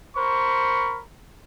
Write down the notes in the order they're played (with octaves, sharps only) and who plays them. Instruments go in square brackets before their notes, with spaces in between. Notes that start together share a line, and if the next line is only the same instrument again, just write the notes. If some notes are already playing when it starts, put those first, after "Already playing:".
[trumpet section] A#4 C5 B5 C#6